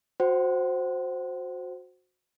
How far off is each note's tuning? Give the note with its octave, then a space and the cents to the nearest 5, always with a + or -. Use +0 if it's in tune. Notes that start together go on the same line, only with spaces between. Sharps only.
F#4 -20 C5 +0 F#5 +40